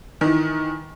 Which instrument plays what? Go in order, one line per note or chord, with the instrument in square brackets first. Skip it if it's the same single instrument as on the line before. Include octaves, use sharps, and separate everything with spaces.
[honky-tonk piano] D#3 E3